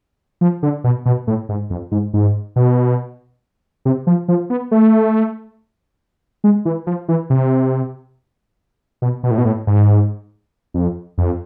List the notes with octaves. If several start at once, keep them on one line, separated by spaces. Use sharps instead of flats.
F3
D3
B2
B2
A2
G#2
F2
G#2
G#2
B2
C3
F3
F3
B3
A3
G#3
E3
F3
E3
C3
B2
B2
A2
B2
A2
G#2
F2
F2